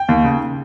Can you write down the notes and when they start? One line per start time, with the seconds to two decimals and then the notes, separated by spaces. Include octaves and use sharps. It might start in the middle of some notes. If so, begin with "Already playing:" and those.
Already playing: G5
0.09 D#2
0.24 C#3